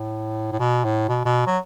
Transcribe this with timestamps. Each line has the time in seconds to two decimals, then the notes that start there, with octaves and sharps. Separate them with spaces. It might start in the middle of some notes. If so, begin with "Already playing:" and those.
Already playing: A2
0.52 A2
0.59 B2
0.84 A2
1.08 B2
1.25 B2
1.47 F#3